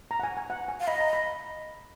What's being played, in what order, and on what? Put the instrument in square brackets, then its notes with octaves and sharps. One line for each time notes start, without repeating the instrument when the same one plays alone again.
[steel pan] A#5
F#5
G#5
G#5
F#5
G#5
[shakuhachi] F5
[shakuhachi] D#5 [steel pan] B5
[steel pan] A#5
B5